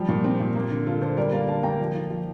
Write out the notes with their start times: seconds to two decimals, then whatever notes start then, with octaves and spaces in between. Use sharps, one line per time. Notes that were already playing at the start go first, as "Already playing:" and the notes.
Already playing: F3 G3 G4
0.08 A#2
0.24 C4
0.39 A#2
0.55 A#3
0.71 D3
0.87 D3 F4 A4
1.01 D3 A4 C5
1.17 G3 A#4 D5
1.32 A#3 D5 F5
1.48 D3 F5 A5
1.63 A#3 G5 A#5
1.80 F3
1.95 F3
2.10 F3